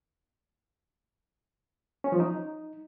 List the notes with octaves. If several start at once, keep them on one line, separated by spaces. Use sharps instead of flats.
C#4
F3
D#4